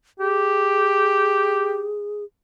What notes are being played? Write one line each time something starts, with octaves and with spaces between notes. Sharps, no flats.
G4 G#4